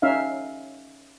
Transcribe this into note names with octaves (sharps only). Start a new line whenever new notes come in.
C#4 D#4 E5 F5